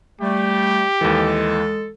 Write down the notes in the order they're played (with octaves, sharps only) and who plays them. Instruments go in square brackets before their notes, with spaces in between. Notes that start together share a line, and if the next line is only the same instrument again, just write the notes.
[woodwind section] G3 A3 [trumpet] G4
[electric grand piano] D#2 E3 [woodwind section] G#3 A4